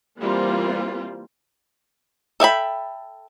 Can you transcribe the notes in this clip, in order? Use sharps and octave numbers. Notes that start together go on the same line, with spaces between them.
E3 G3 A#3 C4 F4
A4 E5 G5 B5